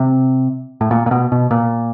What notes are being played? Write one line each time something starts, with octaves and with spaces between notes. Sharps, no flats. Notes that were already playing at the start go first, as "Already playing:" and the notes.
Already playing: C3
A2
A#2
A#2
B2
B2
A#2